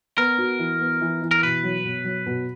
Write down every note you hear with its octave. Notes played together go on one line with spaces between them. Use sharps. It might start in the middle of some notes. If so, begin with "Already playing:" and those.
B3 A#4
F#4
E3
B3
E3
E3
A#4
B2 B4
F#3
B2
F#3
B2